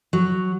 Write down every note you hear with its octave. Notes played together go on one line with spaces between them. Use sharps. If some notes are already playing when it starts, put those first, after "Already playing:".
F#3